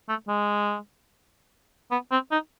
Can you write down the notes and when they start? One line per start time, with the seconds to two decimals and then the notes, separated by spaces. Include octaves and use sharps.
0.09 A3
0.28 G#3
1.91 B3
2.11 C4
2.31 D#4